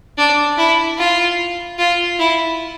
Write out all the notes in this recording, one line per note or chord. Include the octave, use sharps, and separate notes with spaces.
D4
E4
F4
F4
E4